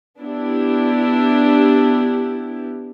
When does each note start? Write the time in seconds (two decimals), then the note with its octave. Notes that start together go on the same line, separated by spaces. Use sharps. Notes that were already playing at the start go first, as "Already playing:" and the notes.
0.18 B3 D4 E4 G4